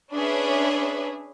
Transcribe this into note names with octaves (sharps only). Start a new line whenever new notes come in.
C#4 D4 G#4 B4 C#5 E5